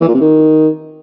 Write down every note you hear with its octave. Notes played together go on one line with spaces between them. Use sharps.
E3
A#2
C3
D#3